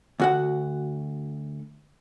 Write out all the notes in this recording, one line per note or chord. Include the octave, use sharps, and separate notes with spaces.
D2 F#4 F#5